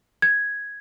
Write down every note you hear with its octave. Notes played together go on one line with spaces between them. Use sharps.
G#6